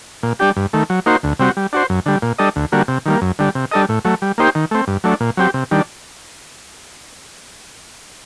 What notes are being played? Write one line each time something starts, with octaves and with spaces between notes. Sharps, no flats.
A#2
G3 D4 G4
G2
D#3 A3
F#3
A#3 D#4 F#4 C5
D2
C3 G3 C4 F#4
G3
D4 F#4 C5
F#2
D3 G3
A#2
G3 D4 A4 D#5
D2
D3 G3 A#3 F#4
C3
D#3 G3 A#3
F#2
D3 G3
C3
G3 D4 A4 D#5
A2
F#3 A3
G3
A#3 D#4 G4 C5
D#3
A3 C4
G2
F#3 A3 D4
A#2
F#3 C4 G4
C3
D#3 G3 D4